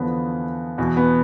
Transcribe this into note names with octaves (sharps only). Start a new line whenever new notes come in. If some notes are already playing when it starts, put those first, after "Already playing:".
Already playing: E2 D3 F3 B3
E2 B2
B3